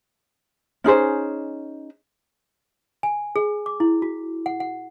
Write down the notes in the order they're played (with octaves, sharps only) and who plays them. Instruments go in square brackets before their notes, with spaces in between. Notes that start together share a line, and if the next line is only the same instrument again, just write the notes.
[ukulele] C#4 D#4 G#4 C5
[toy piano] G#5
G#4
D6
E4
F#4
F#5
F#5